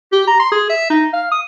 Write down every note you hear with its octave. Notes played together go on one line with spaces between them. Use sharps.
G4
A#5
C6
G#4
E5
D#4
F5
D#6